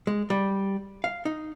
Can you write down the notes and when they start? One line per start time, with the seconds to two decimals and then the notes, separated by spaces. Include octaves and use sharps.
0.07 G#3
0.30 G3
1.04 F5
1.25 D#4